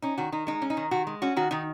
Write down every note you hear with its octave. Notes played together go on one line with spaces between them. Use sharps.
C#4 D#4
D#3 F#4
D#3 D#4
G#3 D#4
C#4
D#4
D#3
D#3 F#4
G#3
C#4 F#4
D#3 F#4
D#3 D#4